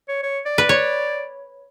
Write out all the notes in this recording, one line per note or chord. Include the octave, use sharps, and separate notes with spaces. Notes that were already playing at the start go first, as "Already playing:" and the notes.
C#5
C#5
D5
B4
C#5